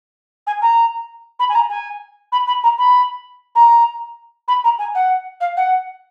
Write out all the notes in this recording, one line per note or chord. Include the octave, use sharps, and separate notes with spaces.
G#5
A#5
B5
G#5
A#5
G#5
B5
B5
A#5
B5
A#5
B5
A#5
G#5
F#5
F5
F#5